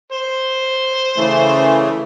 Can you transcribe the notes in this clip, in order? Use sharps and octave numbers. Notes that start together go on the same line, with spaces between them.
C5
C#3 E3 A3